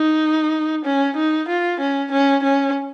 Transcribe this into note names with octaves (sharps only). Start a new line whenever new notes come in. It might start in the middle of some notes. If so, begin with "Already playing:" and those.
Already playing: D#4
C#4
D#4
F4
C#4
C#4
C#4